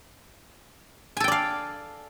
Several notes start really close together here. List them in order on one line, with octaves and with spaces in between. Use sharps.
G#5 A4 G5 D5 F5